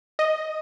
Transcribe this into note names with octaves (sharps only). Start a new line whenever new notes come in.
D#5